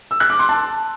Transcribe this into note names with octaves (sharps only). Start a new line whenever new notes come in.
E6
F#6
D6
C6
A5